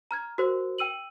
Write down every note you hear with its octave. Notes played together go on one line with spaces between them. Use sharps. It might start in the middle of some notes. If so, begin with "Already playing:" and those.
A#5 F6 G#6
F#4 A#4 C5
G5 E6 D#7 F#7